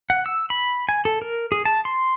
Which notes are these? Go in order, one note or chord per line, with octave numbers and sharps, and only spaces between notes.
F#5
E6
B5
G#5
A4
A#4
G#4
A5
C6